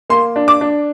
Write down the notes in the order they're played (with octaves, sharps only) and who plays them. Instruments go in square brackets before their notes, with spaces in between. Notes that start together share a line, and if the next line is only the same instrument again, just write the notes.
[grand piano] A#3 C6
D4
D6
D4